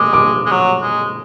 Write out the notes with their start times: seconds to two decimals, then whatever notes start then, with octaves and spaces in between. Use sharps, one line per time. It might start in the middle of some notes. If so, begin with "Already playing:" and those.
Already playing: G#3 D6
0.13 D6
0.46 G#3
0.51 F#3
0.81 G#3